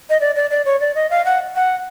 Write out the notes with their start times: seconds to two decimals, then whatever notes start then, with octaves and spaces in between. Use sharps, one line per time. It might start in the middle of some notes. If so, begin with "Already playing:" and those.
0.10 D#5
0.21 D5
0.36 D5
0.51 D5
0.65 C#5
0.80 D5
0.95 D#5
1.11 F5
1.25 F#5
1.56 F#5